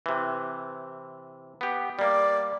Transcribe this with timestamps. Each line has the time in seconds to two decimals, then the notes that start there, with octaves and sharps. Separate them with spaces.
0.06 C3 E3
1.61 B3 G4
1.99 G3 A#3 D5